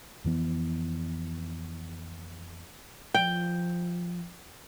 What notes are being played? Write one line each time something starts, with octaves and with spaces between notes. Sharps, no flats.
F2 E3 B3
F3 G5